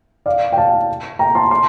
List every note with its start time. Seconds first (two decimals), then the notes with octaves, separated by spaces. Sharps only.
0.26 D5 F5
0.52 G5
0.57 F5 A5
1.19 G5 A#5
1.35 A5 C6
1.51 A5 C6